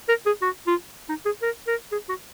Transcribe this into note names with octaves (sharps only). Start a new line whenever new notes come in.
A#4
G#4
F#4
F4
D#4
G#4
A#4
A#4
G#4
F#4